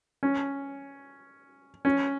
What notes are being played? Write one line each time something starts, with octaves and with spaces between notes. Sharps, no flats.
C#4
C#4